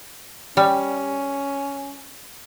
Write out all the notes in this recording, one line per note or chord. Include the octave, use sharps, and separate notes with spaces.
G3 C#4